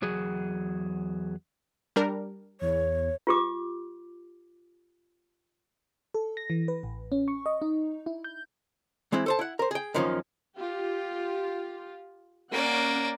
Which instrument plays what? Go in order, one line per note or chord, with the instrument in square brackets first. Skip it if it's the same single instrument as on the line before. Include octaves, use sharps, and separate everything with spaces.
[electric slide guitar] E2 F#3 F#4 G#4
[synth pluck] G3 D4 A#4
[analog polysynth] E2 [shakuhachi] C#5
[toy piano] F4 G4 D6
[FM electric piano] A4
A#6
E3
B4
A1
C#4
C#6
D#5
D#4
E4
G6
[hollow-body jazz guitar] E3 G#3 C4 E4
A4 C5 A5
E4 F#5
A#4 C5
G#4 G5
F#2 D#3 F3 A#3 C4 C#4
[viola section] F4 G4
[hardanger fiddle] A#3 D5 [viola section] C#4 F#5